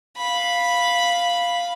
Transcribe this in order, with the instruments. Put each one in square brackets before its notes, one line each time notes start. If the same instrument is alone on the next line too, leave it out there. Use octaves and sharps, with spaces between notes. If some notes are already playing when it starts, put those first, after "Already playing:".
[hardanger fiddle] F5 B5